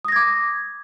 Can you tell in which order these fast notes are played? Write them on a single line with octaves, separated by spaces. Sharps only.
D#6 A#6 G#6 D6